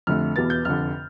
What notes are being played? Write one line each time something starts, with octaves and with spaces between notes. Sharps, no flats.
F2 D3 A3 F6
E2 B2 B3 A6
G6
F1 F2 D3 F6